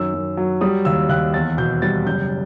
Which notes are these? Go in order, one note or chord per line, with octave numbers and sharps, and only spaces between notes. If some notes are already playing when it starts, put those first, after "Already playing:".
Already playing: F#2 D#3 E6
F#2
F#3
G3 D#6
D#2 E6
D#2 F#6
E2 A6
B2 G6
G3 A6
F#1 G6